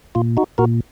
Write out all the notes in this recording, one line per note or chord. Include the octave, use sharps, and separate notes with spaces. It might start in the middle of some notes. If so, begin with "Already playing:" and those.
A#2 F4
D#4 F#4
A#2 F#4 A#4